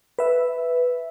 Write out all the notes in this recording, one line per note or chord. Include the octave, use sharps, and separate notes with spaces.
B4 E5